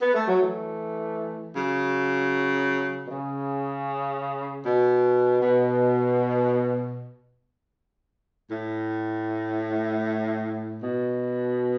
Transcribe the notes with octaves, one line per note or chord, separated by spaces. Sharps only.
B3
A3
F#3
E3 A3
C#3 F#3
B2
C#3
B2
B2
A2
B2